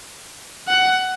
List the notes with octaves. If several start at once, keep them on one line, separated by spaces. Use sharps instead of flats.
F#5